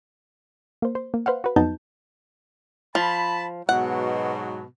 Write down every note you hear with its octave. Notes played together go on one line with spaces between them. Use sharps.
A#3 C5
C5
A#3
B4 C5 F5 F#5
F#4 B4
F2 F#3 B3 D#4 A5 G6
F3 A5 B5
G#2 B2 F#3 F#5